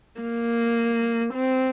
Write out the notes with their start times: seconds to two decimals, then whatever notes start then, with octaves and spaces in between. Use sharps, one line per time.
0.21 A#3
1.33 C4